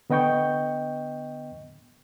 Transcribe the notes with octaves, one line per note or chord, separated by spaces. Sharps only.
D3 B3 D#5 G5 C#6 G6